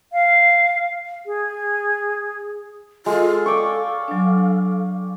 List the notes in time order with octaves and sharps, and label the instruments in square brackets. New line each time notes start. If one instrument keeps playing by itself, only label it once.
[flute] F5
G#4
[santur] G#3 [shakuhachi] F4 [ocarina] A4
[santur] D5 G5 C#6 [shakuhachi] F5
[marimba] F#3 D4